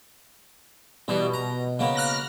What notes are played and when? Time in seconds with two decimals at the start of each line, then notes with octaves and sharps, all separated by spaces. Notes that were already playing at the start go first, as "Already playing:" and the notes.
1.08 B2 E3 G3
1.34 A#5
1.79 C#3 A#3 B3
1.95 F6 F#6 A#6